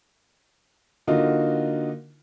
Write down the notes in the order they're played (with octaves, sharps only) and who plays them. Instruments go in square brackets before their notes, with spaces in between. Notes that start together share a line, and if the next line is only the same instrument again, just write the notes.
[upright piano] D3 A#3 D#4 F4 F#4